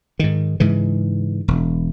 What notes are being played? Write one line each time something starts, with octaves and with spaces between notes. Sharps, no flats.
G#2 D#3
G#2 C#3 E3
E1